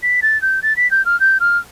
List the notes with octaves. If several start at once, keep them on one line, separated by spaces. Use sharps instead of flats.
B6
A6
G6
A6
B6
G6
F6
G6
F6